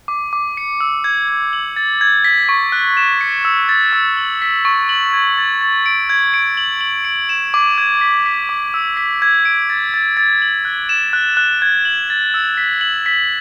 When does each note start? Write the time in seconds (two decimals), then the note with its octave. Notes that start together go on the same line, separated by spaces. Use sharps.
0.08 D6
0.33 D6
0.57 C#7
0.80 E6
1.04 G#6
1.28 G#6
1.53 F#7
1.76 A6
2.01 G#6
2.24 B6
2.49 C#6
2.72 F#6
2.97 E7
3.21 C#7
3.45 E6
3.69 A6
3.93 E6
4.17 F#7
4.42 B6
4.65 C#6
4.89 F#7
5.13 G#6
5.38 A6
5.61 A6
5.86 D7
6.10 G#6
6.34 D7
6.57 F#7
6.81 F#7
7.05 D7
7.29 E7
7.54 D6
7.78 G#6
8.01 B6
8.26 B6
8.49 D6
8.74 E6
8.97 B6
9.22 G#6
9.45 D7
9.70 A6
9.94 A6
10.17 A6
10.42 F#7
10.65 F#6
10.89 E7
11.13 F#6
11.37 F#6
11.62 G#6
11.85 F#7
12.10 A6
12.34 E6
12.57 B6
12.81 F#7
13.06 B6